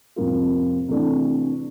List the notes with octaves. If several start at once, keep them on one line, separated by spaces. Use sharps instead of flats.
F2 C3 G3 A#3 F4
C3 E3 A3 D4